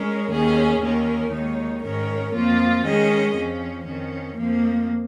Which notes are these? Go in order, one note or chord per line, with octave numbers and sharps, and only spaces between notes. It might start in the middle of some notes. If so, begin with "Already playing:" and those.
Already playing: G#3 C#4 A#4 C#5
D#2 D#3 C#4 G#4
D#2 D#3 C#4 A#4
D#2 D#3 G#3 D#4 C#5
G#2 D#3 C#4 A#4 C#5
F2 F3 A#3 F4
D#3 G#3 C#4 G#4 D#5
F2 F3 C#4
F2 D#3 C#4
F2 F3 A#3